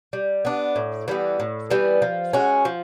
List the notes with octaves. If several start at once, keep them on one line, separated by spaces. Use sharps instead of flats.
G3
B3 D4
A2
E3 G3 B3
A2
E3 G3 B3
F3
G#3 C#4 F#4
F3